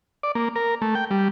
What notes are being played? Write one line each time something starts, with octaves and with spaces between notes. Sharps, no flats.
D5
A#3
A#4
A3
G5
G3